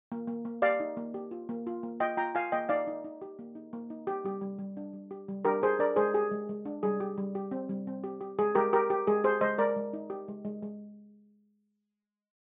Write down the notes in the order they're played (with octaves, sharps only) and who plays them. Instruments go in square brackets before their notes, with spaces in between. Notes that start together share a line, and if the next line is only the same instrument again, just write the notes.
[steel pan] A#3
A#3
A#3
G4 D5 F5
D#4
A#3
G4
F4
A#3
F4
A#3
F4 D#5 G5
F4 G5 A#5
F4 F5 G#5
A#3 D#5 G5
D#4 D5 F5
D#4
D#4
G4
A#3
D#4
A#3
D#4
G4
G3 G4
G3
G3
D4
G3
G4
G3
D4 G4 A#4
G4 G#4 C5
D4 A#4 D5
G#3 G#4 C5
G4 G#4
G#3
G#3
D4
G3 G#4
G4
G3
G4
C4
G3
C4
G4
G4
G#3 G#4
G#3 G4 A#4
G4 A#4
G4
G#3 G#4
G4 G#4 C5
G#3 C5 D#5
G#3 A#4 D5
G#3
D#4
G4
G#3
G#3
G#3